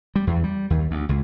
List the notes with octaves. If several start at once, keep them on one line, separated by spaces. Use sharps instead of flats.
G3
E2
G3
D#2
D2
C#2